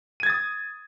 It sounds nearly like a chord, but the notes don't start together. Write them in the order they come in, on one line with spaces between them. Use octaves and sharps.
D#7 G#6 A6 D#6